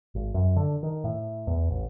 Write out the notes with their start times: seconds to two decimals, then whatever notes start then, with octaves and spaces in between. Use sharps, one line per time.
0.15 G#1
0.34 F#2
0.56 D3
0.83 D#3
1.04 A2
1.47 E2
1.71 A1